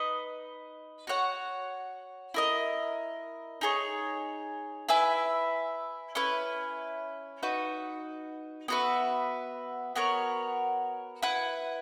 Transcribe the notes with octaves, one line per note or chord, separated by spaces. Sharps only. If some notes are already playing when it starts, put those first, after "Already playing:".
Already playing: D#4 B4 D#5
F#4 C#5 F#5
E4 A#4 D#5
D#4 G#4 C#5
E4 B4 E5 G#5
C#4 E4 B4
D#4 F#4 B4
B3 F#4 B4 E5
B3 F#4 A#4 C#5
E4 B4 F#5